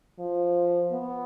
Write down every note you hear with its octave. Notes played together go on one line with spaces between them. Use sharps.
F3
B3